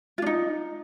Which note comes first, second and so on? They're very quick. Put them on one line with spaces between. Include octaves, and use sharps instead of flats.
F4 D4 D#4